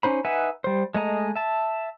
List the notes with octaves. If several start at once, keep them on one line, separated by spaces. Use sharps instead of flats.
C#4 D#4 C5 B5
D#4 B4 E5 F#5 G#5
G3 C5
G#3 A3 D#5 A#5
E5 A5